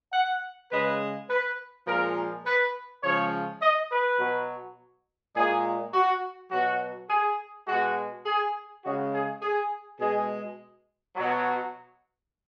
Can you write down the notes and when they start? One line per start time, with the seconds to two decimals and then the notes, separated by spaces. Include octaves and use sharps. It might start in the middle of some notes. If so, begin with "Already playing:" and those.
0.13 F#5
0.71 C#3 G#3 B4
1.30 B4
1.87 A#2 F3 G#3 A#4
2.45 B4
3.03 C#3 F3 G#3 C#5
3.62 D#5
3.91 B4
4.19 B2 F#3
5.35 A#2 G#3 G#4
5.93 F#4
6.51 B2 F#3 F#4
7.09 G#4
7.67 B2 G#3 F#4
8.26 G#4
8.84 C#3 G#3 F#4
9.13 G#4
9.42 G#4
9.99 B2 G#3 G#4
11.16 B2 F#3